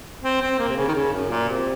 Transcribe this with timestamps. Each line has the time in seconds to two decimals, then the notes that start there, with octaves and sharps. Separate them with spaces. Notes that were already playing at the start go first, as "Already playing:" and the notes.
0.23 C4
0.41 C4
0.59 A#3
0.68 C3
0.77 C#3
0.88 D#3
0.94 C#3
1.13 F#2
1.30 A#2
1.48 C3